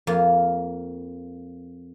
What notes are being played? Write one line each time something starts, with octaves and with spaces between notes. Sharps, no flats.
F2 A#3 F4